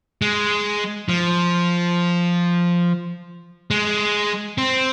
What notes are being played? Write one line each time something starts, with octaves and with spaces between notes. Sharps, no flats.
G#3
F3
G#3
C4